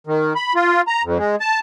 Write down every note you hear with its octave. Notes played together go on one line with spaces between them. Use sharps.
D#3
B5
F4
A#5
F2
G#3
A5